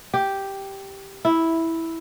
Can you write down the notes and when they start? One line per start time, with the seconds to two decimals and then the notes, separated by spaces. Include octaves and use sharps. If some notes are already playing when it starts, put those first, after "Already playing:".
0.14 G4
1.25 E4